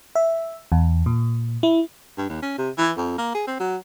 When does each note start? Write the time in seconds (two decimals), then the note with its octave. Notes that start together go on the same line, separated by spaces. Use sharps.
0.15 E5
0.72 E2
1.06 A#2
1.63 E4
2.18 G2
2.29 D#2
2.42 C#4
2.58 C3
2.78 E3
2.97 F2
3.18 A#3
3.35 G#4
3.47 C4
3.60 F#3